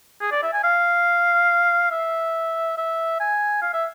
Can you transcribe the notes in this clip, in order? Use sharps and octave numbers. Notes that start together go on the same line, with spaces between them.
G#4
D5
E5
G#5
F5
E5
E5
G#5
F5
E5